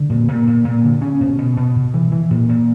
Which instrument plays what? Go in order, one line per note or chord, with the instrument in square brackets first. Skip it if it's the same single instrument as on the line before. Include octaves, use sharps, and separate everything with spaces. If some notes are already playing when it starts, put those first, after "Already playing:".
Already playing: [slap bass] D3
A#2
A#2
A#2
A#2
D3
C#4
B2
B2
B2
B2
E3
E3
A#2
A#2